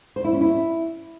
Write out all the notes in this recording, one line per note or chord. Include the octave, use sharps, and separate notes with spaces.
C5
E4
C#4
E4